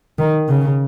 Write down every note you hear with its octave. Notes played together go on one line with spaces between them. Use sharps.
D#3
C#3